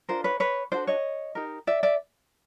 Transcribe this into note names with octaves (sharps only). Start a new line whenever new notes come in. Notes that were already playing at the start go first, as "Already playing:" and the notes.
D4 F4 A#4 C5
B4 C#5
B4 C#5
D4 F#4 A4 C5 D5
C#5 D#5
D#4 G4 A#4
D5 E5
D5 E5